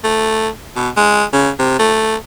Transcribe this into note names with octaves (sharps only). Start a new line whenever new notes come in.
A3
B2
G#3
C#3
C3
A3